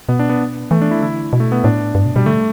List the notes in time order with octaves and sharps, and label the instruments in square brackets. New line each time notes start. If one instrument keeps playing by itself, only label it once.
[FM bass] B2 [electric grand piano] B3
[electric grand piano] D4
B3
[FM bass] E3 [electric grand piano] A3
[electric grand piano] D4
E4
[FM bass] D3 [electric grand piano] E4
[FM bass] B2
[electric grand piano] A3
B3
[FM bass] A2 [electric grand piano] D4
[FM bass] G2
B2
[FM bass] B2 [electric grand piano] G3
[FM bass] D3 [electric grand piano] A3